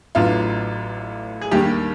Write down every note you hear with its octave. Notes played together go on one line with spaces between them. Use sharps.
A1 A2 F#3 B3 D4 F4
G#4
D#2 D#3 G3 A#3 D4 G4